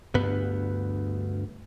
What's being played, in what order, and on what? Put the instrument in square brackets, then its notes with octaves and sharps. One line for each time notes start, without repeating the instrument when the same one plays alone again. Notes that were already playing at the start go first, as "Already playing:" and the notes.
[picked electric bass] D2 G2 B3